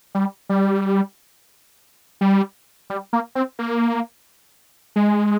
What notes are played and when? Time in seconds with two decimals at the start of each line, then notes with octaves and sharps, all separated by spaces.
0.15 G3
0.49 G3
2.21 G3
2.90 G3
3.13 A#3
3.35 C4
3.59 A#3
4.96 G#3